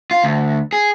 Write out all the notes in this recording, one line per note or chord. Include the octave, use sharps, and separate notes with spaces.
F4
D2
G#4